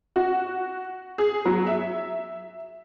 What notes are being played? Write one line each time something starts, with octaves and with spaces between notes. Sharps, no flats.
F#4
G#4
F#3
E5